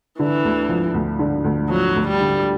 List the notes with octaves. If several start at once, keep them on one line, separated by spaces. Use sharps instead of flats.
D3 E3
D2
F3
D2
D3
D2
F3 F#3
D2
G3
D3